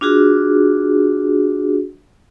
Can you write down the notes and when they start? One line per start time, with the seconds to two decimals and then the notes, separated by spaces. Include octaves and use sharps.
0.01 D4 F4 F#4 G#4